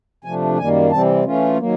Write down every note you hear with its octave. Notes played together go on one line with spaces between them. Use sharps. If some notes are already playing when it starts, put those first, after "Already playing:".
C3 F3 A3 D4 G#5
F#2 D#3 G3 A#3 G#5
C3 E3 G3 C4 A5
E3 A3 C#4 F4
D#3 F#3 A#3